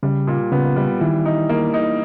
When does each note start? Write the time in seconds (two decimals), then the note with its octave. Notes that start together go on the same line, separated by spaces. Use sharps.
0.03 C#3 G3
0.27 A#2
0.52 C#3 B3
0.76 G3
1.01 D#3 E3
1.25 D#4
1.49 A#3
1.74 D#4